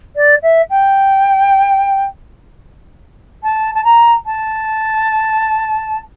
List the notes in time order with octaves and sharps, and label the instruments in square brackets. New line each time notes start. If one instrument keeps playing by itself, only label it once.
[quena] D5
E5
G5
A5
A5
A#5
A5